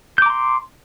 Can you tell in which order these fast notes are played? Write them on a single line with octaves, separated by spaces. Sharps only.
G6 D6 A#5 C6